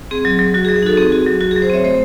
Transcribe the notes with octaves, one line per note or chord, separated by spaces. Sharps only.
C4 G#4
F#3
F#3
F#3 F#4
G#4
F#3
G#4
D#4 F#4 A4
C4 G#4
F#4
F#3
F#3 F#4
G#4
F#3
G#4 C5
C4 C#5 E5
A3 C5 D#5